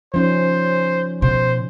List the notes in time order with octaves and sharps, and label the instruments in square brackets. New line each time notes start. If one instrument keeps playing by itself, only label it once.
[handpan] F3 C#4 D#4 [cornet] C5
[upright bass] B2 [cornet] C5